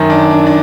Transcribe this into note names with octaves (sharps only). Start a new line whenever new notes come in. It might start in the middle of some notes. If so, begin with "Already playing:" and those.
Already playing: F#2 D#3
D4
D4
D4